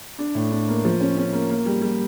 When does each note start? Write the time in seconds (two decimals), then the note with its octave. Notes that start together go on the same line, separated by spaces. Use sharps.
0.19 D4
0.35 A2
0.51 D4
0.68 A#3
0.85 F3
1.01 C#4
1.17 C#4
1.33 A#3
1.49 A#3
1.66 G3
1.82 G3